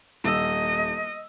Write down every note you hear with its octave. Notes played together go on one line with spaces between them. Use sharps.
D#1 D#5 E6